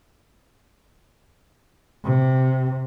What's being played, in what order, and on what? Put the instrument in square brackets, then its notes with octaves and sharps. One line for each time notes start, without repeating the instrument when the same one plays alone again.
[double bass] C3